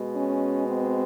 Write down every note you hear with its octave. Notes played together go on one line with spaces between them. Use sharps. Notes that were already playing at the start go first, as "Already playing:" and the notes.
Already playing: B2 G#3
C#4
C4